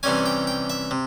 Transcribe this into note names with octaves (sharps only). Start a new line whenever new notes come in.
C3 E3 G3 C#4 G#5
G5
G5
E5
C3